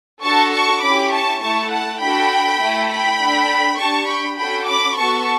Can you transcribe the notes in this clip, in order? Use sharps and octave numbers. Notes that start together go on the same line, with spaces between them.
D4 F#4 A4 A5 C#6
A5 C#6
C#4 E4 G4 B5 D6
A5 C#6
A3 E4 A4 A5 C#6
F#5 A5
D4 F#4 A4 G5 B5
A3 E4 A4
G5 B5
D4 A4
D4 G4 A5 C#6
G5 B5
C#4 F#4 A4 G5 B5
B5 D6
B3 F#4 A4 A5 C#6